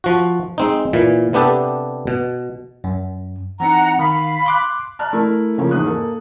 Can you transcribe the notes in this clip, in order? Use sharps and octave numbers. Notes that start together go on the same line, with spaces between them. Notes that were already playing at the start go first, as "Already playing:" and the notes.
F3 F#4
G#3 C4 D#4
A#2 E3
C3 B3 D4 G4 A4
B2
F#2
E3 C4 D#4 F#5 A#5
D#3 F5 B5
C6 D6 F#6
D5 A5 A#5 F6 F#6
A3 E4 A#4
C#3 F3 A#3 C#4
E2 G#2 D#6 F#6
A#3 A4